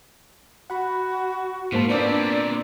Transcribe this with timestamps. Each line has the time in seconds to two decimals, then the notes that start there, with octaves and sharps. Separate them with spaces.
0.70 F#4 F#5 B5
1.72 G#2 B2 A#3 C5 A5
1.90 A#2 B3 C4 D4 D5